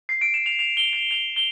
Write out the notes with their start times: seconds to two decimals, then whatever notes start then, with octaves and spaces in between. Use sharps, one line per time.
0.09 C7
0.21 D7
0.34 E7
0.46 F7
0.59 F7
0.77 G7
0.93 F7
1.11 F7
1.36 G7